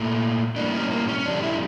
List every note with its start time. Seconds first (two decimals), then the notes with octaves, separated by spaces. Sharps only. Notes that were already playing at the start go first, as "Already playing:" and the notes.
Already playing: A#2 A3
0.56 A2 G3 A#3 D4
0.73 C#4
0.91 A#3
1.08 C#4
1.19 C#4
1.26 F2 D3 G3 D4
1.43 E4